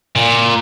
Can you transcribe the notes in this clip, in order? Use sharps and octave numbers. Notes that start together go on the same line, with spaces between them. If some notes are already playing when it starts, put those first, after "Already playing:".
A#2